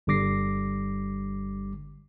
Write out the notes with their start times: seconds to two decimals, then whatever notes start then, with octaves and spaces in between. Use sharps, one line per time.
0.07 G1 D3 G3 D6 A#6 C7